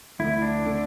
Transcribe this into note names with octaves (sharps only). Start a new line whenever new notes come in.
D2 D3 A3 E4
D4
D3 A3